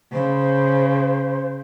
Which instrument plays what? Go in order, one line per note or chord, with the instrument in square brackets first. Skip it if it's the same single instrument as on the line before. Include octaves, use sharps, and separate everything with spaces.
[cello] C#3 [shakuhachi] C5